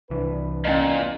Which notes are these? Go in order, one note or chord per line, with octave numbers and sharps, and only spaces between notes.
C2 E3 D4 B4
E2 A#2 C#4 D#4 D#5